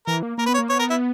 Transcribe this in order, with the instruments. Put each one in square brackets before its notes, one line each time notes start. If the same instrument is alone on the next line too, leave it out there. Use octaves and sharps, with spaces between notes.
[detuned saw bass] E3 [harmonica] A#4
[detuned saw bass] A#3
[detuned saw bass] A#3 [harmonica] A#4
[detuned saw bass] B3 [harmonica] B4
[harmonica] C#5
[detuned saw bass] A#3
[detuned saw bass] B3 [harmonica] C#5
[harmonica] A#4
E4